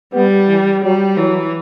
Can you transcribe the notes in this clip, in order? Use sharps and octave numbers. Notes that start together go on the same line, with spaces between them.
G3 B3
E3
F#3 G3
E3 F#3